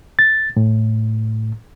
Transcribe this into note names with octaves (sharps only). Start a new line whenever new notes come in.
A6
A2